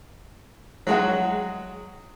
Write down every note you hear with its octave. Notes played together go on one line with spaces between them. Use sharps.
F#3 G#3 F#4